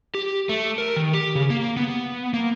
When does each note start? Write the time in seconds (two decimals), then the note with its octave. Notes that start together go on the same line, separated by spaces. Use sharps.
0.15 G4
0.49 A3
0.78 A#4
0.96 D#3
1.14 G4
1.35 C#3
1.50 A#3
1.77 B3
2.34 A#3